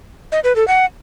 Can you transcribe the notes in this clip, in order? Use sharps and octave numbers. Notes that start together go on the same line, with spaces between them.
D#5
B4
A4
F#5